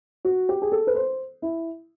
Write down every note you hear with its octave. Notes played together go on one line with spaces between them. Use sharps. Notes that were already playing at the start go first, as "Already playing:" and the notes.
F#4
G4
G#4
A4
B4
C5
E4